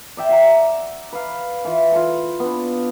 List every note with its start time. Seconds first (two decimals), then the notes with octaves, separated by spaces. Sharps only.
0.17 D5 E5 G5
0.29 E5 F#5 A#5
1.13 B4 F5
1.65 E3 F4
1.92 F4 A4
2.40 B3 D4